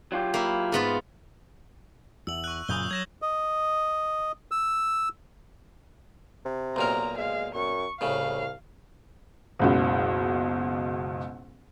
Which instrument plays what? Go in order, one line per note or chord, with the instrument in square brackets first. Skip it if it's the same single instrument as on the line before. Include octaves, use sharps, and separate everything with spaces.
[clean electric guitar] F#3 F4 G4
[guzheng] A#3 E4
G#2 B3 F4
[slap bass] E2 [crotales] E6 F#7
[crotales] C#6 F#6
[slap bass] F#2 A#2 C#3 [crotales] D#6 G6 G7
[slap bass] F#3 [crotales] G#6 A#6 E7
[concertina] D#5
E6
[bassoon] C3
[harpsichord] B1 A#2 A#4 [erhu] A#5
[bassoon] G#3 [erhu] F5
[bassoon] F#2 [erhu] C#6
[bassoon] C2 [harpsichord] A2 C#3 [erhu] F5
[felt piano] F#1 C#2 B2